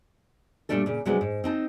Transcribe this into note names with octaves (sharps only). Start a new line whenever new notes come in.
A#2 F3 G3 A3 D4 A4
A#2 C#3
C3 F#3 G#3 B3 D4
G#2
C4 D#4 A5